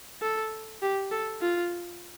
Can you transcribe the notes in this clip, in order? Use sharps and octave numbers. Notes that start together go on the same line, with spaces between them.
A4
G4
A4
F4